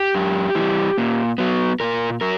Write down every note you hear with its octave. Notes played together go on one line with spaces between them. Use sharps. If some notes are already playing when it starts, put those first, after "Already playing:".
Already playing: G4
F#2
E3 G3
A#2
F#3 B3
A#2 A#4
F#3 A#4